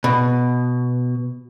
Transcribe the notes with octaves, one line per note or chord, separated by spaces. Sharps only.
B2